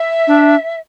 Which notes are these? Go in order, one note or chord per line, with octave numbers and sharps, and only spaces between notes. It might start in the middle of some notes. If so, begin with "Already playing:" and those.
Already playing: E5
D4